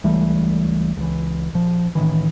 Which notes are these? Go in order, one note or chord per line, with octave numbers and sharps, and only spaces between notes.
C#2 E3 G3 A3
C#2 E3
A#1 F3
A1 D#3 E3